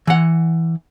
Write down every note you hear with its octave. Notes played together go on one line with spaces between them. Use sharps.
E3 F#5